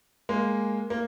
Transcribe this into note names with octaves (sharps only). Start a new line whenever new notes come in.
G#3 A#3
A#3